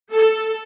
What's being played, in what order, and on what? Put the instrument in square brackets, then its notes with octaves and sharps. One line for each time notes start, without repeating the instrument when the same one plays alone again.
[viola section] A4